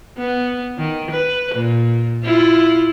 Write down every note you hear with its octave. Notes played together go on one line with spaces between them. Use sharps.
B3
D#3
B4
A#2
E4 F4